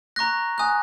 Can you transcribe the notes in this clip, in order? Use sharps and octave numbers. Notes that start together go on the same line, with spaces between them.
A#5 C#6 F#6 A#6
G#5 D#6 F#6